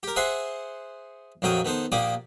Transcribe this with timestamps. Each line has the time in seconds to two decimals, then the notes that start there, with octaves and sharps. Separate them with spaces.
0.03 G4 A#4
0.16 G#4 C5 E5 F#5 G#5 C6
1.42 A#1 F2 F#3 A#4 G5 D#6
1.65 D#3 B3 A4 C5
1.92 A#1 A#3 G4 D5 D6 D#6